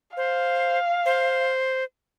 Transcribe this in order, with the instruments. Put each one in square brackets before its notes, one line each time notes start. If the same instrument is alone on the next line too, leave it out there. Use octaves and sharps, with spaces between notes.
[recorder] C5 [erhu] F5
[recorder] C5